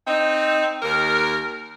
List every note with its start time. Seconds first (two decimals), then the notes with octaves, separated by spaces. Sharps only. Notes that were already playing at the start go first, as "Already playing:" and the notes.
0.08 C4 D#4
0.83 D#2 A#4